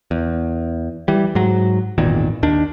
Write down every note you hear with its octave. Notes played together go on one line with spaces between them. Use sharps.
E2
E3 G3
G#2 F#3
G#1 E2 A#2 D#3
D#2 D#3 D4